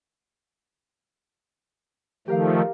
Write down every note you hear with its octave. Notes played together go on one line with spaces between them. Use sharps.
D#3 F3 A3 G4 A#4 F5